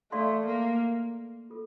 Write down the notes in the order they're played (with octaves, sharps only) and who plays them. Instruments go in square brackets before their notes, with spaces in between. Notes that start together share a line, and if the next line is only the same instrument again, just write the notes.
[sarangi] A3 [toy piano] A4 D5 F5 C6
[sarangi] A#3
[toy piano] F4 A4